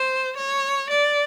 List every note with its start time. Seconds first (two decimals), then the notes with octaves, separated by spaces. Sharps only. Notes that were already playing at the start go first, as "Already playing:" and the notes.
Already playing: C5
0.37 C#5
0.90 D5